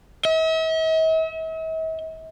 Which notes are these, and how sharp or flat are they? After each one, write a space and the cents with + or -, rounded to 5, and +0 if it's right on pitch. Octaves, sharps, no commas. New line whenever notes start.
E5 -45